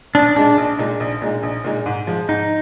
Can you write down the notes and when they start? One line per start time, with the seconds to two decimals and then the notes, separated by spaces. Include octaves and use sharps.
0.15 A#1 D4
0.36 A#2 G#3 D4 D#4
0.58 A#1
0.79 A#2 G#3 D#4
1.00 A#1
1.22 A#2 G#3 D#4
1.43 A#1
1.64 A#2 G#3 D#4
1.86 G#2
2.07 F3 G#3
2.28 G#2 D#4